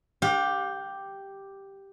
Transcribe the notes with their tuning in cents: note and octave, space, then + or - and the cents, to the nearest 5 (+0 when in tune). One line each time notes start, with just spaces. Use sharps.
G4 +0 F5 +40